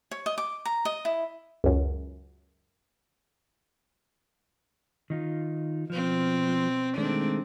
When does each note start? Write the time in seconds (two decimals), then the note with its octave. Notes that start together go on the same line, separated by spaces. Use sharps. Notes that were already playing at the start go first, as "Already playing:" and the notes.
0.11 C#5
0.26 D#5
0.38 D6
0.65 A#5
0.85 D#5
1.05 E4
1.64 C#2 F#2
5.10 D#3 D#4 F4
5.90 B2 F3 C4
6.97 D#3 G#3 A3 C4 D4